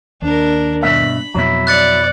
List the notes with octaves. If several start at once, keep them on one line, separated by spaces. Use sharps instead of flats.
D#2 D4 A#4
G2 B2 E5 B5
F2 B2 F#3 B3 E4
D5 F#6 A6 C#7